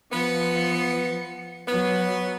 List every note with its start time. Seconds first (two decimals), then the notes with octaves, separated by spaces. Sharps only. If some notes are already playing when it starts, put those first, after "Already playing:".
0.12 F3 B3 C#7
1.68 F#3 B3